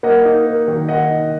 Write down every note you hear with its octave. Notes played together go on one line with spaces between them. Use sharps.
A#3 D#5 F#5
D#4
A#3
D#3
D#3 D#5 F#5
D#4